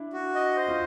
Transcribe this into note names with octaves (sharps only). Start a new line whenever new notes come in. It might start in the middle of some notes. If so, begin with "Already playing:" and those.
Already playing: D4 E4
F#4
D#5
C5
F4